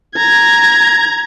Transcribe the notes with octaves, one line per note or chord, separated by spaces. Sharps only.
A#5 G#6